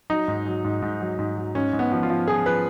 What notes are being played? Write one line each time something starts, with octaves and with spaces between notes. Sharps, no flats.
F#3 D#4
G#2
F#3
G#2
G#2
F#3
G#2
F#3
G#2 C#4
G#2
B3
F3
F4
F3
F3 G#4
F3 B4